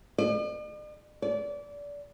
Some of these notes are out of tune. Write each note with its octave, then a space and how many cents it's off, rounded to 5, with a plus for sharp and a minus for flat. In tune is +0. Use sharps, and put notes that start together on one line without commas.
D5 +45
D5 -25